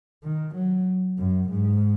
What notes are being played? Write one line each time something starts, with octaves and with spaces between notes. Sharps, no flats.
D#3
F#3
F#2
G#2